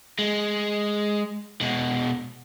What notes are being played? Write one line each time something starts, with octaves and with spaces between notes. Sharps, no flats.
G#3
B2 G#3